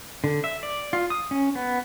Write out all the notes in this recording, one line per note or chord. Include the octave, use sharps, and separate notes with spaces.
D3
E5
D5
F4
D#6
C#4
B3